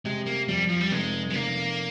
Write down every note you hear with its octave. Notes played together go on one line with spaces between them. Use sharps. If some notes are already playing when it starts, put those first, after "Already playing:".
C3 G#3
A#3
F2 G3
F3
G3
F1 G#3
G#3
F1 A#3